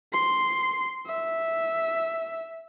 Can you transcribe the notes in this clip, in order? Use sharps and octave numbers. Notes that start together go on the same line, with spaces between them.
C6
E5